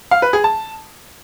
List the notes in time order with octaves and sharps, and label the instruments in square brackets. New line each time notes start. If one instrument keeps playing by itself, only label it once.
[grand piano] F5
B4
G#4
A5